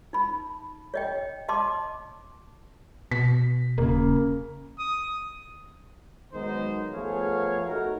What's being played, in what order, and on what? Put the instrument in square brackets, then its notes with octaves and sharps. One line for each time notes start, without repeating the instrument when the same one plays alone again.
[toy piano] D#4 B5
C#5 D#5 G5
D#5 A5 C6 D6
[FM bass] B2 [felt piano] B6
[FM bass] D#1 [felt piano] C#3 A#3
[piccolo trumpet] D#6
[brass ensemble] D#3 F#3 G#3 B3 D#4 C5
F3 A3 B3 G#4 C#5 F5
A3 D#4 F#4 A#4